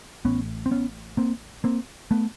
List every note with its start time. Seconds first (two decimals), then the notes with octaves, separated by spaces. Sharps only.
0.25 A1 A2 B3 C#4
0.66 C4
0.71 B3 C#4
1.17 A#3 C4
1.64 A#3 C4
2.11 A3 B3